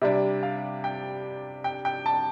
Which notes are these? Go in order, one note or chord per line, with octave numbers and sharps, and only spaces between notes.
C3 G3 D4 E5
F5
G5
G5
G5
A5